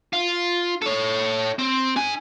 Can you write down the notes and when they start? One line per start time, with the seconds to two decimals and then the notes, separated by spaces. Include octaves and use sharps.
0.13 F4
0.82 A4 C#5
1.59 C4
1.96 D#4 G#5